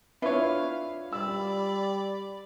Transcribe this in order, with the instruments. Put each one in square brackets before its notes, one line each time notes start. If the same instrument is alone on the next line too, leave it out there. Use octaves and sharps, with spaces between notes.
[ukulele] D4 F4 B4 [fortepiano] E4 C#5 [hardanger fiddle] F5
[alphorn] G3 [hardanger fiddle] D5 B5 [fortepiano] E6